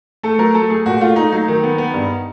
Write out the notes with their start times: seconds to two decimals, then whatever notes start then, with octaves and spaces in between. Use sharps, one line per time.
0.23 A3 A4
0.39 F#3 A#4
0.54 A3 A4
0.70 A3 G#4
0.86 A#2 F#4
1.01 A3 F4
1.16 A3 D#4
1.32 F#3 D#4
1.48 D#3
1.63 B3
1.78 B3
1.94 G2